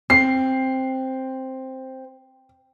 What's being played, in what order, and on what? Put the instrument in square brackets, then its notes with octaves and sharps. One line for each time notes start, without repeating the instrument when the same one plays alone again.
[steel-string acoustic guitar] C4 [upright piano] C7